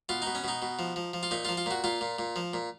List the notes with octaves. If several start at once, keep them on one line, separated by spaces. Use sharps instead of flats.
B2 F4
B2 D#4
C#4
B2 D#4
B2
F3
F3
F3
F4
A#2 D#4
F4
F3
F4
A#2 F#4
A#2 F4
A#2
A#2
F3
A#2